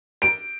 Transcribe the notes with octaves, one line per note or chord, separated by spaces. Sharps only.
D7